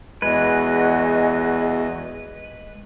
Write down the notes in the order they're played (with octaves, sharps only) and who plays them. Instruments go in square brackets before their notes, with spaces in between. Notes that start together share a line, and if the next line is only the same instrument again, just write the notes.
[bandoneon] E2 [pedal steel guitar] G#3 B4 [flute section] F#4 G#4 D#5